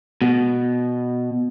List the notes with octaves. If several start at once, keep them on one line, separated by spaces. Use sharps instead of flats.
B2